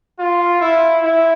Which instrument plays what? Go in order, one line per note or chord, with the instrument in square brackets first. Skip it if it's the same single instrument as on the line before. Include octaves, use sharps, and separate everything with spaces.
[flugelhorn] F4
E4
E4